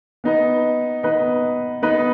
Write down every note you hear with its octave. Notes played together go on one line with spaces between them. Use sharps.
B3 D#4 B4 D#5
B3 D#4 B4 D#5
B3 D#4 B4 D#5